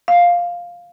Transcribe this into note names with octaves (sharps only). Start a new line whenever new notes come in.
F5